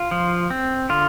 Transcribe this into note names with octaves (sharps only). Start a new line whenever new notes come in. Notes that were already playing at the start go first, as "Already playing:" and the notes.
Already playing: F4
F3
C4
D3 F4